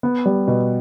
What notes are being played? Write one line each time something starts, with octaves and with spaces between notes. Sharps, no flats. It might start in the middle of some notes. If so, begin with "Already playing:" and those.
B3
G3
B2